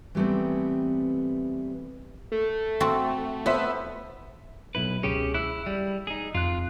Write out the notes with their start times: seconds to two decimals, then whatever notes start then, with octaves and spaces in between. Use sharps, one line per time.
0.15 E3 G3 A3 B3 C4
2.32 A3
2.80 C4 F#4 A4
3.46 B3 B4 C5 E5
4.75 B1 E4 B4
5.03 C#2 C#4 G4 G#4
5.34 E4 E6 F#6
5.66 G3
6.07 D#4 G#4
6.35 F2 F4 F#6